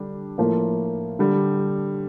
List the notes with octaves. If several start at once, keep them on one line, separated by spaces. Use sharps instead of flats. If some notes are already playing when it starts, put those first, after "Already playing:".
Already playing: D3 G3 D4 G4
A2 F3 A#3
D3 G3